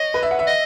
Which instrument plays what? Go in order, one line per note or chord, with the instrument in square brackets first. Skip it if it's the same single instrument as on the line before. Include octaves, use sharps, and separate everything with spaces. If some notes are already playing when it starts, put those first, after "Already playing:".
Already playing: [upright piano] C#5 [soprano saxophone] D#5
[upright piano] B4
E5
F#5
E5
[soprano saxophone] D#5